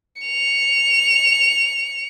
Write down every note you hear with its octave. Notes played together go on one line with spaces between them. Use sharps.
C#7 F7